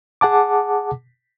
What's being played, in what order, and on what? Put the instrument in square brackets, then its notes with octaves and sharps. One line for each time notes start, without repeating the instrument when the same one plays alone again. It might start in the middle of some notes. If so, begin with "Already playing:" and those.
[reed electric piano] G#4 F#5 A5 D6